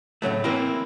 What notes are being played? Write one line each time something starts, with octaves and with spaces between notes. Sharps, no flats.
A2 C#3 F#3 A3
E3 A#3 C4 E4